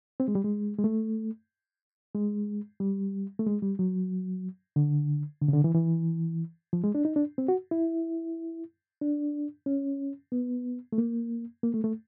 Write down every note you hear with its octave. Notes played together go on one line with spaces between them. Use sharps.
C4
G#3
G3
G#3
G#3
A3
G#3
G3
A3
G#3
G3
F#3
D3
D3
C#3
D3
E3
E3
F3
G#3
D4
D#4
D4
C4
F#4
E4
D4
C#4
B3
A3
A#3
A#3
A3
A3